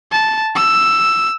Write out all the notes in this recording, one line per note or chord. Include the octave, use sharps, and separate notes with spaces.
A5
E6